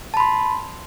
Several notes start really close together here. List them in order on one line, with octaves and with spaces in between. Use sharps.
A5 B5 C6